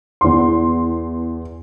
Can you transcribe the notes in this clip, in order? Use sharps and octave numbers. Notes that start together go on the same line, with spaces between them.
E2 C6